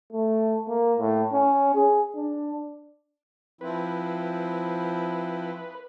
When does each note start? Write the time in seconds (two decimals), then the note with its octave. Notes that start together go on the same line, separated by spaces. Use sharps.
0.13 A3
0.68 A#3
0.99 A2
1.33 C#4
1.75 G#4
2.15 D4
3.61 F3 C4 E4 B4